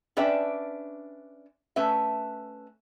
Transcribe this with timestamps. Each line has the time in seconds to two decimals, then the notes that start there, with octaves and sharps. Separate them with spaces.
0.17 C#4 D4 B4 D5 E5 G5
1.76 A3 C#4 B4 E5